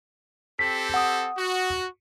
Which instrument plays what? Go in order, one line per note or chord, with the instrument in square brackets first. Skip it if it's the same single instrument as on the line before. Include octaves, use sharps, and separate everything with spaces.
[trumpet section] C4 G4 A4 [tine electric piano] B6
[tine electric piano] F#5 D#6
[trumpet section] F#4